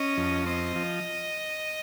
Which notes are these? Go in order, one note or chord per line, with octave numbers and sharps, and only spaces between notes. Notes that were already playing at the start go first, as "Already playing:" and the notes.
Already playing: C#4 D#5
F2
C4 D#5
F3